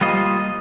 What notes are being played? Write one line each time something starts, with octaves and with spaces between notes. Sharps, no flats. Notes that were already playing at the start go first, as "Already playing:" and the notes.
G3 A#3 F4 C5 D#5